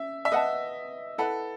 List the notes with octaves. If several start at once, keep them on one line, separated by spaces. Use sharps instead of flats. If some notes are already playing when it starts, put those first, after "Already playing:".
Already playing: C#4 E5
E5
B4 D#5 F#5 A5
E4 A4 B4 F#5 B5